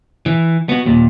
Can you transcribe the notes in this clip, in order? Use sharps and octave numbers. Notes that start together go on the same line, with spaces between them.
E3
B3 F#4
D#2 A#2